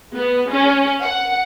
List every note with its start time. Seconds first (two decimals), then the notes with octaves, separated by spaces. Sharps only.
0.15 B3
0.50 C#4
1.02 F#5